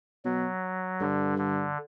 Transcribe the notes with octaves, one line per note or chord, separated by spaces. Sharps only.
B2 F#3
G2 D3
D3